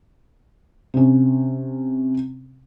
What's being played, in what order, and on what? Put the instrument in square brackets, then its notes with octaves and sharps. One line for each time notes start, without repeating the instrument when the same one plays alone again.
[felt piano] C3 C#4